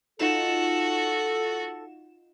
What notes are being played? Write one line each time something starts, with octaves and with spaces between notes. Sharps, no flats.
D#4 F4 F#4 A4 E7